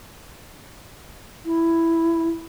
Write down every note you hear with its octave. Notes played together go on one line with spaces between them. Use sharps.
E4